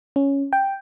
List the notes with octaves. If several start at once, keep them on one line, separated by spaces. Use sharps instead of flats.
C#4
G5